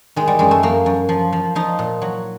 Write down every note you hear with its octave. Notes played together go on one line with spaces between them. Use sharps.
D#3 G#3
G3
F#2 G#3
A3
F#2 A#3
F#2
F3
F3
F3 D#4
A#2
F#3